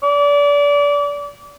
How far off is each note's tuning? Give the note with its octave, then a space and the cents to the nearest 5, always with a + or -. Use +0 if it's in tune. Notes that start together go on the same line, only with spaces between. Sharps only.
D5 -30